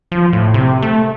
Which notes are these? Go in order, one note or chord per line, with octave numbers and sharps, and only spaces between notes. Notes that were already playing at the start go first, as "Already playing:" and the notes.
F3
A2
C3
A3